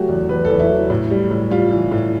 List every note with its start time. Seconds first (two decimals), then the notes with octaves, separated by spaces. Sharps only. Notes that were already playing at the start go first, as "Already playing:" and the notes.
Already playing: F#3 A3 F#4 G4
0.09 E2
0.29 E2 B4
0.45 A4
0.50 E2
0.60 E4
0.70 F#3
0.90 A2
1.10 G3
1.31 A2
1.51 G3 F4
1.71 E3
1.91 A2